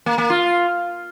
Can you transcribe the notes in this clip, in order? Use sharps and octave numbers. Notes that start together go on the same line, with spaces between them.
A#3
A#3
F4